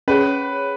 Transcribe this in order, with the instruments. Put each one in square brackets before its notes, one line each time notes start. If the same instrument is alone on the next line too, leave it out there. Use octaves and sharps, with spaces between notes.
[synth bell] C#4 G#4 C#5 [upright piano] B4